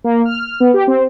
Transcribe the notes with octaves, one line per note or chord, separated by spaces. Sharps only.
A#3
F6
B3
G4
C4